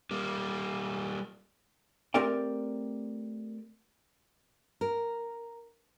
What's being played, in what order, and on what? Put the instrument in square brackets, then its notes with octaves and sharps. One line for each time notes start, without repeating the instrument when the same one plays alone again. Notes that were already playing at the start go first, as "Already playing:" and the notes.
[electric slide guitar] G3 A#3
[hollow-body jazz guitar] A3 C4 G4 A#4 D5 G5
[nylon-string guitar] A#4